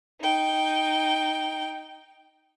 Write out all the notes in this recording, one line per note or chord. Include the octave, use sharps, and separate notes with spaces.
D#4 G5